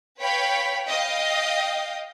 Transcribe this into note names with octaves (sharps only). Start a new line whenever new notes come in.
B4 C#5 F5 G5 B5
D#5 F5 G5